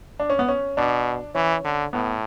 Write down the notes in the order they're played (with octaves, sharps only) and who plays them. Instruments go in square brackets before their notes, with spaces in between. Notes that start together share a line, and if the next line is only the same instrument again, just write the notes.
[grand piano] D4
C#4
B3
C#4
[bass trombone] B2 [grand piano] D4
[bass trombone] E3 [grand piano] C#4
[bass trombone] D3
[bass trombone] A2 [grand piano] B3